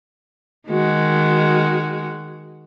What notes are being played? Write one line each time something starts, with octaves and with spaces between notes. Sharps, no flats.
D#3 G#3 F#4